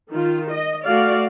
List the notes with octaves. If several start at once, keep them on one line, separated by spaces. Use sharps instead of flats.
D#3 F4
D#5
A3 F#4 D5 F5